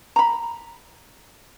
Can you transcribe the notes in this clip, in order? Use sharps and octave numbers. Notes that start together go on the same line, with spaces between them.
A#5 B5